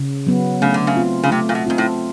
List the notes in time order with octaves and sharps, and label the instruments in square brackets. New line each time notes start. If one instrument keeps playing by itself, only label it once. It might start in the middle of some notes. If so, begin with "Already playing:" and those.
Already playing: [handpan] C#3
F#3 B3
[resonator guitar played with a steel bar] C#3 [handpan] A3
[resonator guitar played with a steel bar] D3
C#3
[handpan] C4 F4
[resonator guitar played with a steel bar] C#3
[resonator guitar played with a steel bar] C3 [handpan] A3
[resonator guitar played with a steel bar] A#2
B2
[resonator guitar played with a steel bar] G#2 [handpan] C4 F4
[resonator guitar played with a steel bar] A2